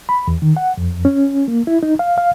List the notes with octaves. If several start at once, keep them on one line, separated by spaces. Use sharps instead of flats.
B5
E2
D#3
F#5
F2
C#4
A#3
E4
D#4
F5
F5